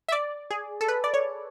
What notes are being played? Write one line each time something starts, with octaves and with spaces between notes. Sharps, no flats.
E5
D5
G#4
A4
B4
D5
C#5